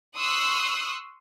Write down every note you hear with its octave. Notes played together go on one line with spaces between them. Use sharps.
C6 C#6 D#6 E6 F#6